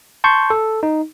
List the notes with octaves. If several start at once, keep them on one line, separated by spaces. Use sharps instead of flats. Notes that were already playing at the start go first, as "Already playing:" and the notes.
A5 C6 C#6 G6
A4
D#4